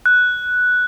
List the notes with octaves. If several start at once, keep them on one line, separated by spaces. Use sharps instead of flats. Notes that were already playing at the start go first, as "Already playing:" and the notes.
F#6